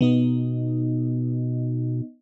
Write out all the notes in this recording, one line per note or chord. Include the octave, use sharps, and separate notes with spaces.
B2 B3 D#4 D#5